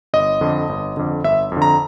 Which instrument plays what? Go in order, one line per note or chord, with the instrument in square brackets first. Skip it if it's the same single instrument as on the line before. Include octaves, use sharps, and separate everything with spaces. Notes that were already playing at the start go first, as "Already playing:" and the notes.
[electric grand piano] G1 D#5
F2 D3
G1
F2 D3
G1 E5
F2
D3
A#5